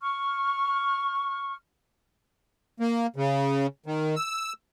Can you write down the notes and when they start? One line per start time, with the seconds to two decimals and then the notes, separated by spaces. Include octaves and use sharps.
0.01 C#6 F6
2.80 A#3
3.16 C#3
3.86 D#3
4.16 E6